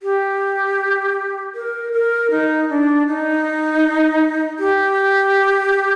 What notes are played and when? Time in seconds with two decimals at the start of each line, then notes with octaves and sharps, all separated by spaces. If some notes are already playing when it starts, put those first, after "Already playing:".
0.03 G4
1.55 A#4
1.93 A#4
2.31 D#4
2.69 D4
3.07 D#4
4.59 G4